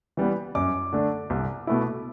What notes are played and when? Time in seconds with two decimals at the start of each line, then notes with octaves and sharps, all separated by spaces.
0.17 E3 G3 B3
0.55 F#2 D6
0.93 D3 A3 D4
1.30 C2
1.67 B2 A3 E4